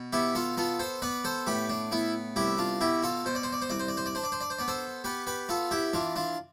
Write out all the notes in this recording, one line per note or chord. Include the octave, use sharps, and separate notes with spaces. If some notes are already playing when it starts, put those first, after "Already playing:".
Already playing: B2
B3 E4 G4
F4 A4
B3 F4 A4
A4 C5
B3 B4 D5
A4 C5
A2 G4 B4
D4
B3 E4
C2 E4 G4
D4 F4
B2 E4 G4
F4 A4
B2 C5
D5
C5
D5
C5
C2 D5
C5
D5
C5
D5
D4 C5
D5
C5
D5
C5
B3 D5
A4 C5
B3 G4 B4
G4 B4
B3 F4 A4
E4 G4
E3 D4 F4
D4 F4